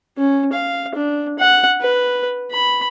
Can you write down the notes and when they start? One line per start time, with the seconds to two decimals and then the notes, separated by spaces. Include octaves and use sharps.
0.17 C#4
0.53 F5
0.95 D4
1.39 F#5
1.81 B4
2.51 B5